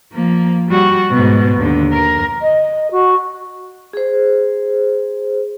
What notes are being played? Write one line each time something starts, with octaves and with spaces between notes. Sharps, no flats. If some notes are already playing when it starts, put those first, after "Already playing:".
F3 A#3
G3 F#4
G#2 B2
D#2 D3
A#4
D#5
F#4
G#4 C5